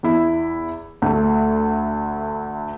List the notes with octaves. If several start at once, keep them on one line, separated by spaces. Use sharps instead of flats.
E2 E4
D2 A3